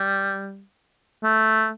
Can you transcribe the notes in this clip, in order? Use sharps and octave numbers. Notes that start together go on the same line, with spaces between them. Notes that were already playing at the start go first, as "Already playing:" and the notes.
Already playing: G3
A3